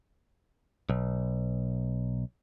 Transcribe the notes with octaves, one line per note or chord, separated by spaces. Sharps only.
B1